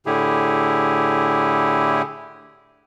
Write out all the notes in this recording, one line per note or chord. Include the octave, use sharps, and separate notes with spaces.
A2 D3 E4 G4 G#4